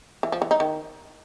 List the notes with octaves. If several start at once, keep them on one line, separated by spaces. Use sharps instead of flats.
E3
F3
E3
D#4
D#3